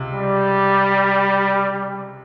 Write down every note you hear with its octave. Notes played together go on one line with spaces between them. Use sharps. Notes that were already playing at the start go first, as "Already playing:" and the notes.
Already playing: C#2 C3
G3